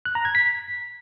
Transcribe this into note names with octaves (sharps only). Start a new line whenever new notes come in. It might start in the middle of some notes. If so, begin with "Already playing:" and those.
F#6
A#5
G#6
B6